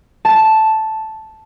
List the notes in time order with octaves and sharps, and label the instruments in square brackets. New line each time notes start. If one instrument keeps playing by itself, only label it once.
[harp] A5